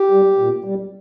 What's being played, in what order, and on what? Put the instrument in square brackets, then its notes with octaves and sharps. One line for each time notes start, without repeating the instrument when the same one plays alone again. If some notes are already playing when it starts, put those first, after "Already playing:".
Already playing: [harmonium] G4
G3
A#2
G3